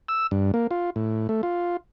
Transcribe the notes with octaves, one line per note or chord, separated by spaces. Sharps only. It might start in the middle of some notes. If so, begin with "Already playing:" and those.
E6
G2
A#3
F4
A2
A3
F4